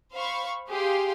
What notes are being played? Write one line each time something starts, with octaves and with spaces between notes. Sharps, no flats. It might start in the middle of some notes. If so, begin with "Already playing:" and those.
C5 F5 B5 C#6
G4 G#4 F5 G5 C6